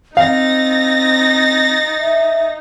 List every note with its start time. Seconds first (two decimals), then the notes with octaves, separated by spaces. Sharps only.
0.17 C4 D#4 F5 A6 A#6
1.99 E5